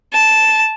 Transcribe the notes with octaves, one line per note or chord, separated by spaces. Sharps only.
A5